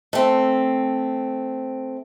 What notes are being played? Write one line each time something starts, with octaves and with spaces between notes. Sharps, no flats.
A3 C4